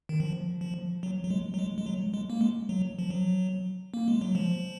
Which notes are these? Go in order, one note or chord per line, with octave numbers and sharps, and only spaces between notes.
D#3
F3
F3
F#3
F#3
G#3
F#3
G#3
G#3
F#3
G#3
A#3
G#3
F#3
F3
F#3
A#3
G#3
F#3
F3